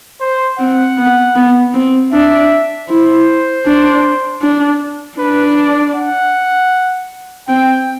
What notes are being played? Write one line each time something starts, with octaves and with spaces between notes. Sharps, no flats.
C5
C4 F#5
B3
B3
C4
D4 E5
E4 C5
D4
D4
D4 B4
D5
F#5
C4 G5